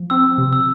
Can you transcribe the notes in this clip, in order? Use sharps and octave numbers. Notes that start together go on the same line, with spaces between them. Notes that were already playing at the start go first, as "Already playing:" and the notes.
Already playing: F3
C4 E6
C3
E6